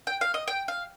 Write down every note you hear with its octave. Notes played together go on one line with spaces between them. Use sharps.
G5
F5
D#5
G5
F5